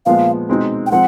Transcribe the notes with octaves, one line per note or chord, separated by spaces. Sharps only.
A#2 F3 G#3 B3 F5
B2 G#3 C4 D#4
G5
F3 G#3 C4 F#5